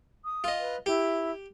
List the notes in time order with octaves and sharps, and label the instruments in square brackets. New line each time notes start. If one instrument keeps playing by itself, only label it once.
[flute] D#6
[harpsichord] F4 D#5
[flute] B4
[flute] E4 [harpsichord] G4